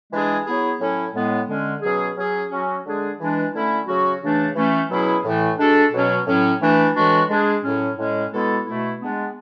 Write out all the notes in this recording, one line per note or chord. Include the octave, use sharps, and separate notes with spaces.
E3 G#3 D4 G#4
F#3 B3 E4 G#4
A2 F#3 C#4 E4
A2 G#3 B3
D3 G#3 C#4
B2 F#3 C#4 G#4
F#3 C#4 G#4
F#3 C#4 F#4
D3 G#3 D4 G#4
E3 G#3 D4
D3 A3 C#4 E4
C#3 F#3 C#4 F#4
C#3 E3 A3 D4
E3 A3 C#4
B2 F#3 C#4 E4 G#4
A2 E3 A3
G#3 D4 F#4 A4
B2 F#3 C#4
A2 F#3 C#4
E3 A3 D4
A2 E3 G#3 D4 F#4
G#3 D4 G#4
A2 F#3 C#4
A2 G#3 C#4
B2 G#3 B3 E4 A4
B2 A3 E4
G#3 B3 D4